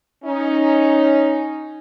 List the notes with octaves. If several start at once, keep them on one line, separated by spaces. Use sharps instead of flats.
C#4 D#4